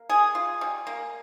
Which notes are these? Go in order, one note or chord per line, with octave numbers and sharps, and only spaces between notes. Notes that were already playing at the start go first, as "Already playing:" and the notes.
Already playing: A#3
G#4
F4
G3
A#3